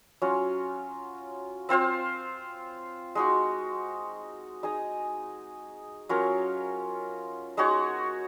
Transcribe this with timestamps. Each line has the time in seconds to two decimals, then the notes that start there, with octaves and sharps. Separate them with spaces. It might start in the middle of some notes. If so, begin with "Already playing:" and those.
0.22 F#3 C#4 F4
1.69 C4 F4 C5 F5
3.15 G#3 D#4 F#4
4.63 D#4 G#4 D#5
6.09 F#3 C#4 F4 A#4
7.57 G#3 D#4 F#4 C#5